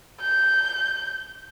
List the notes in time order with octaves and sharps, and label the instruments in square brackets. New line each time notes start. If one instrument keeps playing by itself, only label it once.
[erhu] G6